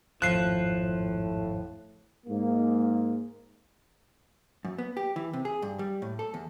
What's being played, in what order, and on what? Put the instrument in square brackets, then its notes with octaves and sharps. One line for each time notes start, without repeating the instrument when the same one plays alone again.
[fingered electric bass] G#1 F2 [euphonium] A2 [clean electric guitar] F3 [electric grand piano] F#6 C7
[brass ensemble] G#2 A#3
[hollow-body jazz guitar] F#2
B3
G4
E3
C3
G#4
G2
G3
A2
A4
E2